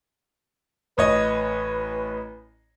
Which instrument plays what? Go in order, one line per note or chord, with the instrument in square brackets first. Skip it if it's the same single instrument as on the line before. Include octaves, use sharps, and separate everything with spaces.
[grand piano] A1 C#5 D#5 [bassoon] B4